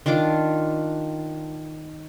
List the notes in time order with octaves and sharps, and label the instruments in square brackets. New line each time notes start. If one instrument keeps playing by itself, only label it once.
[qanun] D#3 D4 F4 D6